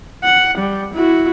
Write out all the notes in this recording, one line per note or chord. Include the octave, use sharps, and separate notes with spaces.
F#5
G3
E4 F#4